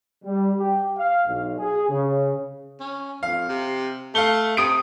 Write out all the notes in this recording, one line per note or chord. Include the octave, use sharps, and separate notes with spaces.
G3
G4
F5
B1
G#4
C#3
C#4
F2 F5
C3
A3 F5 G7
C3 D#6 D7